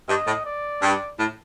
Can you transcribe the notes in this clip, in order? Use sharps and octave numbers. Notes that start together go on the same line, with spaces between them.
G2 D#5
A2
D5
G2
A2